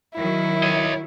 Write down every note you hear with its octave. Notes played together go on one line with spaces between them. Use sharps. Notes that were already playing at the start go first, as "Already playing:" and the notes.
D#3 F#3 E4
C#5 D#5